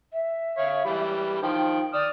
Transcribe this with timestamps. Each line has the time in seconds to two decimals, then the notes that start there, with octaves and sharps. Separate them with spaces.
0.13 E5
0.58 C#5 F5
0.85 E3 G3 B5
1.42 D#3 F3 G5
1.94 D5 D#6 F6